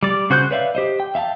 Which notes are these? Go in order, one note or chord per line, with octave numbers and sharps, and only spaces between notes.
G3 D5
C#3 F#4 C5 F#6 G6
B4 C#5 D5 E5 F5
G4 C5 D#5
G5
E5 F5 G5 A5